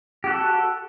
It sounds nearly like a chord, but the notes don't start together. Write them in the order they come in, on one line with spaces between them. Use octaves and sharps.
G4 F#4 A4